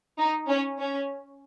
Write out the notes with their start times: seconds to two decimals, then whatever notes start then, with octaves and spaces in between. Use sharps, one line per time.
0.19 D#4
0.49 C#4
0.79 C#4